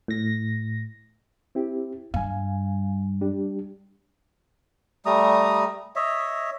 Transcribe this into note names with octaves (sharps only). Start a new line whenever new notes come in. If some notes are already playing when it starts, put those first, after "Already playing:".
A2 A#6
C4 E4 G4
G2 F5 G#5
G3 D4 G4
G3 A3 A#5 D#6
C#5 D#5 E5